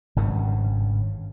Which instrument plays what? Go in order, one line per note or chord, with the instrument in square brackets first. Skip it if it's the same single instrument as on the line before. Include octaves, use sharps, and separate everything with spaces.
[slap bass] G#1 G2 C#3